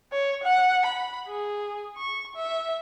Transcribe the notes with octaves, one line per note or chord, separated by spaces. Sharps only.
C#5
F#5
B5
G#4
C#6
E5